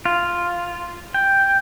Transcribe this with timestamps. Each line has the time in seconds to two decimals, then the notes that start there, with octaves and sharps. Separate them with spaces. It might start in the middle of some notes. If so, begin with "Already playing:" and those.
0.05 F4
1.14 G5